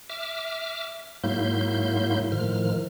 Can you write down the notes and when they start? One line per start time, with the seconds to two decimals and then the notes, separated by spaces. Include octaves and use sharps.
0.10 E5 D6 F6
1.24 G#2 F#3 A#3 E4 C6 G6
2.32 A2 D#3 F3 F6